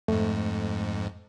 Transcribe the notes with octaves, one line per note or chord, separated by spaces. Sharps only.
F2 G#2 A3